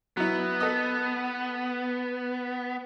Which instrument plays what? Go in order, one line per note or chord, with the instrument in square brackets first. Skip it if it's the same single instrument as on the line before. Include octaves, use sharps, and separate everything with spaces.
[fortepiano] F#3 E4 [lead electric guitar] B3
[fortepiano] A4 D#5